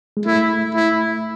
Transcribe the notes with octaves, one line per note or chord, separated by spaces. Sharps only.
G#3
A3 E4
E4